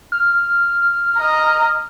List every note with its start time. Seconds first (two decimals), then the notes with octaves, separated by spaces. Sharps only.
0.12 F6
1.18 D#5 A#5